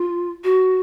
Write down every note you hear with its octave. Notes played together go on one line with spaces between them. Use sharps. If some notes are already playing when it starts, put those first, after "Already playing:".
Already playing: F4
F#4